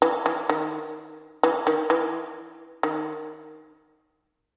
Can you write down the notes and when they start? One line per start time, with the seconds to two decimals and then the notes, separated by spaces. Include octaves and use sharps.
0.02 E3
0.26 E3
0.49 D#3
1.43 E3
1.67 D#3
1.90 E3
2.83 D#3